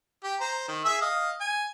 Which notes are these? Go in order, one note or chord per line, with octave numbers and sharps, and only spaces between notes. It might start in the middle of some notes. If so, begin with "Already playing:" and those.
G4
C5 A#5
D#3
G#4 E5 E6
D#5 F5
G#5